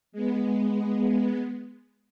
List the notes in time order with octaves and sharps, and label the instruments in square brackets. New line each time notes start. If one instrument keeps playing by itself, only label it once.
[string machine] G#3 B3